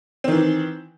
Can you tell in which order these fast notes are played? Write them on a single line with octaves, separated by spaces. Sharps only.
C4 D#3 E3